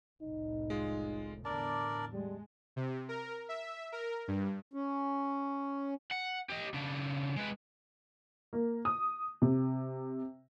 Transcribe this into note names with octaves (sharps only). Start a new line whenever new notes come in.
F1 C2 A2 D#4
G#3 F4
E2 A2 D3 D4 A#4 D5 A5
G3 G#3
C3
A#4
E5
A#4
G2
C#4
F#5
G4 D#5
C#3 D4
G#3 B4
A#3
D#6
C3